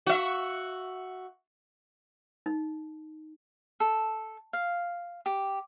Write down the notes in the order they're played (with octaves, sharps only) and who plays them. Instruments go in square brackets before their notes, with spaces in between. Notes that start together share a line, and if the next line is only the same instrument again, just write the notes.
[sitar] F#4 E5
[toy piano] D#4
[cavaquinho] A4
F5
G4